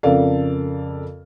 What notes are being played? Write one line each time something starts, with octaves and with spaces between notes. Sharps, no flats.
F2 C#3 A4 A#4 D5 F5